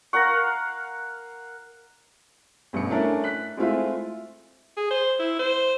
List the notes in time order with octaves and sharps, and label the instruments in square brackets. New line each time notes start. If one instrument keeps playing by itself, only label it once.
[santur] A#4 F5 F#5 [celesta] C#6 A#6
[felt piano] A1 G2 B2 C#7
A3 C#4 D4 E4 A#4
F#6 B6
G#3 A3 C4 E4 F4
[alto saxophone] G#4
C5
E4
C5